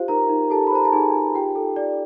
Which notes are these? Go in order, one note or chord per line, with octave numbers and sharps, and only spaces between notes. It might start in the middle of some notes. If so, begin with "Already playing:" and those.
Already playing: F4 G4 C5 F5
D#4 A#4 A#5
D#4
G4 A4 A5
B5
C5 A#5
A5
D#4 G#4 G#5
D#4
F4 G4 G5
A4
D5